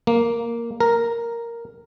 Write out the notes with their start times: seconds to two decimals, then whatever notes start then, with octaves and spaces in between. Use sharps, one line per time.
0.07 A#3
0.80 A#4